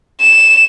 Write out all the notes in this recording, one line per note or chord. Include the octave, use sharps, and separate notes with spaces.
E7